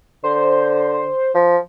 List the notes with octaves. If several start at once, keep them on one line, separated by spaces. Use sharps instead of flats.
D3 C5
F3